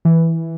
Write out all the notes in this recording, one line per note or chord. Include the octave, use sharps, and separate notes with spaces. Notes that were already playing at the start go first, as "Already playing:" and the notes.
E3